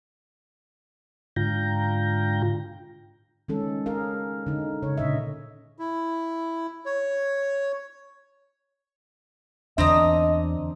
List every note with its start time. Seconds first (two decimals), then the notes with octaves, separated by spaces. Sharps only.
1.36 G#2 D3 F4 G5 A#5
3.48 D#3 G#3 C#4 A4
3.86 G#4 A#4 F5
4.47 D3 D#4
4.82 C#3 C#5
4.97 A#2 D3 D#5 E5
5.79 E4
6.85 C#5
9.78 E2 D3 C4 D4 D#5 A#5 D#6